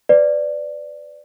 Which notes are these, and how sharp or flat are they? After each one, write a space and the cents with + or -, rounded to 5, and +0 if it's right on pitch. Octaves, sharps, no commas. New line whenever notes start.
B4 +30 D5 +0